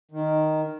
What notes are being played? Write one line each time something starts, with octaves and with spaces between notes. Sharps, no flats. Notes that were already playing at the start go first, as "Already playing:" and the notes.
D#3